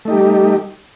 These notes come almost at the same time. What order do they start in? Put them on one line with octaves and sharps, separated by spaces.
A3 D#4 G4 G3